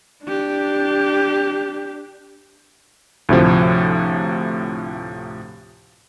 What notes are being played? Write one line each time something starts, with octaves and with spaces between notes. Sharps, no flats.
D4 G4
D2 A2 C3 F3